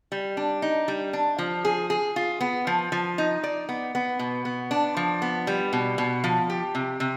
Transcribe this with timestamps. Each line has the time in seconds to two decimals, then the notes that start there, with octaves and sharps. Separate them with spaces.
0.12 G3
0.37 D4
0.62 D#4
0.88 G3
1.13 D4
1.38 F3
1.65 G#4
1.90 G#4
2.16 F4
2.41 B3
2.67 F3
2.92 F3
3.18 D#4
3.44 D5
3.69 B3
3.95 B3
4.19 B2
4.45 B3
4.71 D4
4.97 F3
5.22 B3
5.47 G3
5.73 B2
5.98 B2
6.24 F3
6.50 G4
6.75 C3
7.00 C3